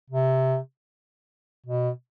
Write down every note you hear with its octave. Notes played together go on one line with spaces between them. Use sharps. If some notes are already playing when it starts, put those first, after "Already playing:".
C3
B2